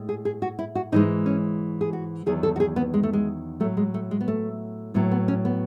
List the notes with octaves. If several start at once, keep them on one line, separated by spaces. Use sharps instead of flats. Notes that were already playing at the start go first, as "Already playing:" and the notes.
Already playing: A2 G#3
G#4
G#4
F#4
E4
F#4
G#2 E3 G#3 D#4
C#4
G#4
F#4
E2 D#3 F#3 G#4
A4
F#4
G#4
B3
G#3
A3
G#3
A2 F#3 A3
G#3
A3
G#3
B3
A3
A2 F#3 B3
B3
C#4
B3